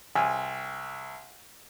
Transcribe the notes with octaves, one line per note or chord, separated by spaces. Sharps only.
C2 G#5